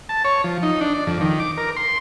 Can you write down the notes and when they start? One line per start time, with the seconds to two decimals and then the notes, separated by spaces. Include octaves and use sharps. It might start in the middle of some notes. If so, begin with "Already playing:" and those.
0.09 A5
0.24 C#5
0.44 F3
0.63 D#4
0.81 D4
0.94 D5
1.07 F2
1.21 D#3
1.40 D6
1.58 A#4
1.76 C6